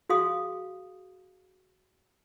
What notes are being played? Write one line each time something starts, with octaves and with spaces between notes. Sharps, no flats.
F#4 G#4 F5 C6 D#6